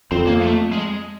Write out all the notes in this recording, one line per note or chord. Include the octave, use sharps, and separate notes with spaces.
F2 C4
A#3
A3
G#3